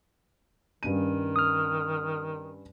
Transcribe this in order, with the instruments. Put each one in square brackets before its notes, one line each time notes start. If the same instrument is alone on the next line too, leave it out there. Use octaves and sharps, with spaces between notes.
[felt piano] G2 C#4 D#7 [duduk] D#3
[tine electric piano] D#6 F6